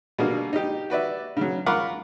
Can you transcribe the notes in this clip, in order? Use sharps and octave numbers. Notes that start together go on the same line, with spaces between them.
B2 D3 G3 G#3 A#3
D#4 G4
F#4 B4 D5 E5
C#3 F#3
F4 A#4 F#5 B5 C#6 D6